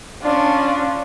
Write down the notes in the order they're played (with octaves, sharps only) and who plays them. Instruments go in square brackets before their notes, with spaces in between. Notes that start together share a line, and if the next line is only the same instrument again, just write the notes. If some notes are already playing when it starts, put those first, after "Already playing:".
[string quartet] C#4 F4 [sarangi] D4